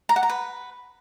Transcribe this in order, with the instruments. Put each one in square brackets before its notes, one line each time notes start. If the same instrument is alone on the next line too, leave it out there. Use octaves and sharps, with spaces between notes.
[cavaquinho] A#5
F#5
A#5
B4